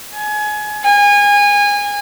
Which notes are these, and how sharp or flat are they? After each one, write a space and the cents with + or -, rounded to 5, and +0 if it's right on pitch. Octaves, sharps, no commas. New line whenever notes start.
G#5 +25
G#5 -25